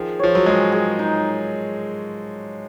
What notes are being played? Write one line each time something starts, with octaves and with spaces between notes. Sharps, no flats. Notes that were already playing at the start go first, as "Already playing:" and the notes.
Already playing: D#3 F3 G#4
F3 C#5
F#3
G#3 G#4
G#4
D#4